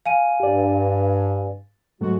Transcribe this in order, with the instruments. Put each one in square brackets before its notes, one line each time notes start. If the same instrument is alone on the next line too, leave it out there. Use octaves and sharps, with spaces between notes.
[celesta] F5 G#5 D#7
[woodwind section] G2 [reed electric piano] G4 D5
[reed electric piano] G#2 F#3 A3 [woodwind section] G#3 F#4